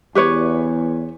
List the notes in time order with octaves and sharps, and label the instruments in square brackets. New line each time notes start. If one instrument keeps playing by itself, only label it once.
[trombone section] E2 [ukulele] G4 B4 C#5